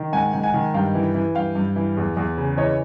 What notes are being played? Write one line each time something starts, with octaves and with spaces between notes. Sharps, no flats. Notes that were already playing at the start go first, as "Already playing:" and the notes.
Already playing: D#3
G#2 F#5 G#5
G#2
F#5 G#5
D#3
G2 F5 G5
E3
E3
G2 F5 G5
G2
E3
E2
E2
C#3
E3 C#5 D#5